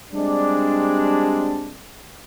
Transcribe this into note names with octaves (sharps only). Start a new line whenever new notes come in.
G3 G#3 C4 D4